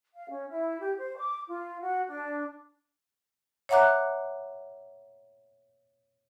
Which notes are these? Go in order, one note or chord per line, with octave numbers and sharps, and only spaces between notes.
F5
C#4
E4
G4
C5
D6
F4
F#4
D4
C#5 E5 F#5 A#5 D6 F#6